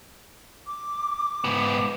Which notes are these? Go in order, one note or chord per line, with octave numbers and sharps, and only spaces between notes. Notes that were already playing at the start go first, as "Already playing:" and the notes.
D6
G#2 B3